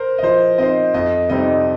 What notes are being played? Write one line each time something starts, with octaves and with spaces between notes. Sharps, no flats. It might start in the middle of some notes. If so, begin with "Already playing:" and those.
Already playing: A#4 C5
D#5
F3 C5
C4 D#4 C5 D#5
F2 D#5
C3 G3 C4 D#4 D#5